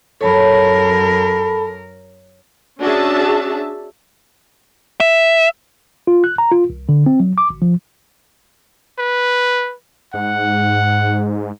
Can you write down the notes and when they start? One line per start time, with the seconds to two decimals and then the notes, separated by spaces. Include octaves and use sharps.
0.21 F#2 A4 A#4 C#5 A5 B5
2.79 C#4 D4 F#4 G#4 E5 A5
5.00 E5
6.07 F4
6.24 F#6
6.38 A#5
6.52 F4
6.70 C2
6.89 D3
7.06 C4
7.20 F#3
7.38 D6
7.50 G#1
7.62 F3
8.99 B4
10.14 G#2 F#5